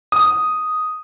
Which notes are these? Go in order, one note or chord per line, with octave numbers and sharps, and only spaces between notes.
D#6